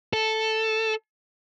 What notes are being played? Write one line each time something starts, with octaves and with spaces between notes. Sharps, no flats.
A4